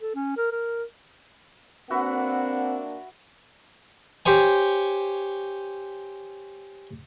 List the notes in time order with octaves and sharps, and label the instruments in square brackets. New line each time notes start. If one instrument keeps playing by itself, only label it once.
[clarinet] A4
C#4
A#4
A#4
[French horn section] A#3 D4 A#4 [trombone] C4 [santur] F#4 B4 E5 [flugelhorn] F#5
[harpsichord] G4 C5 C#5 G#5